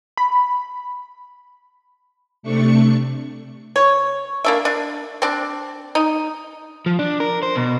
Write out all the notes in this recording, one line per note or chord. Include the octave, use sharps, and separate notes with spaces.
B5
C3 A3 D4 C#6 C#7
C#5
A#3 D4 E5
D4
C4 D4
D#4
F3
D4
A#4
C5
B2